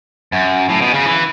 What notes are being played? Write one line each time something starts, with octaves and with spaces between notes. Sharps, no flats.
F#2
A2
B2
C#3
E3